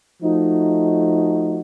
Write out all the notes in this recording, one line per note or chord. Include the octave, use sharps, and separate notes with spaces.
F3 A3 D#4 F#4